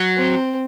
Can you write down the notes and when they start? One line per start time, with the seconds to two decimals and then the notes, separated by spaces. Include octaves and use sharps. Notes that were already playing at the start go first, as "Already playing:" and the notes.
Already playing: F#3
0.17 C4